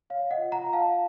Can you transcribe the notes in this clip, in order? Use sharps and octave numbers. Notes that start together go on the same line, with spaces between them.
C#5 F5
D#5 F#5
F4
F#5 A#5
F4
F5 A5